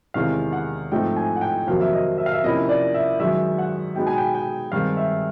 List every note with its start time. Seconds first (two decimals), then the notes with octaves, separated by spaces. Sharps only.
0.14 E2 C3 D#3 G#3 C4 F5
0.53 F#5
0.92 G#2 F3 A3 C4 D#4 G5
1.16 G#5
1.36 F#5
1.41 G5
1.67 F2 C3 D#3 F#3 A#3 F5
1.81 E5
1.93 D#5
2.18 E5
2.26 F5
2.33 E5
2.43 C3 F3 A#3 C#4 E4 D#5
2.69 D5
2.94 E5
3.20 F#2 D#3 G#3 E5
3.58 F#5
3.96 B2 G#3 B3 D#4 G5
4.07 G#5
4.18 G5
4.35 G5
4.72 G2 D#3 G#3 C4 F5
4.97 E5